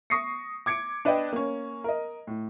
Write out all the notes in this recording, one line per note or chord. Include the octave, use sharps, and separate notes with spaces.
C#6 D#6 A#6 C7 C#7
D6 G#6 C#7 D7
D4 B4 D5 D#5 G5
A#3 C#4
A#4 D#5
A2